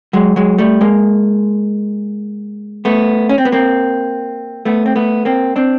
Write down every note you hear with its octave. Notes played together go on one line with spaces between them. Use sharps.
F#3 G#3
F#3 G#3
G3 A3
G#3 A#3
A3 B3
C#4
C4
B3
A#3 C4
A3 B3
C4
A3 B3
A#3 C4
C4 D4